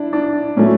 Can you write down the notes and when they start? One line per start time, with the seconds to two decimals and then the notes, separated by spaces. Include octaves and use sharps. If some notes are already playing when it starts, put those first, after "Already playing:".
Already playing: D4 E4
0.13 D4
0.56 A2 F#3 A3 C#4